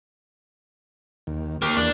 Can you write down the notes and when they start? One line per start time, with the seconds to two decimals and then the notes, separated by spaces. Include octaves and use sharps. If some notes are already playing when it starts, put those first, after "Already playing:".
1.27 D#2
1.62 A#3 G4
1.77 E2 A#3 D4